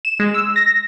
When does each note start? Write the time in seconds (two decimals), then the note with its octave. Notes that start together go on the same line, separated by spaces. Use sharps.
0.05 E7
0.20 G#3
0.34 E6
0.56 A#6